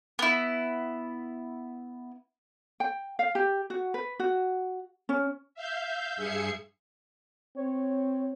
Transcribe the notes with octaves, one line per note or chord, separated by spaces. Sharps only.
B3 E4
G5
F5
G4
F#4
B4
F#4
C#4
E5 F5 G6
G2 G#4 E5 G#6 C7 C#7
C4 C#5